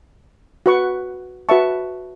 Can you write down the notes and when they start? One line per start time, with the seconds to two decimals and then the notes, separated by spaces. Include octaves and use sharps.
0.66 F#4 B4 F#5 C#6
1.49 F#4 B4 E5 A5 C#6